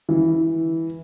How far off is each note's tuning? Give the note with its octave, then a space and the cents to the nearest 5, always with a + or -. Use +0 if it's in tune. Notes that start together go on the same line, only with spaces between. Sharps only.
E3 -10